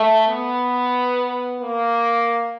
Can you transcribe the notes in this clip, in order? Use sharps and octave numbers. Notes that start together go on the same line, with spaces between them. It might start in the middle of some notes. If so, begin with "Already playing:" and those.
Already playing: A3
B3
A#3